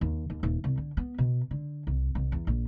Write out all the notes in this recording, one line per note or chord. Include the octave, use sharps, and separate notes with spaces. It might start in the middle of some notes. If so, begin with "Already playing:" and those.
D#2
D#2
D#1
C2
D3
B3
B2
D3
C2
C2
E2
A#1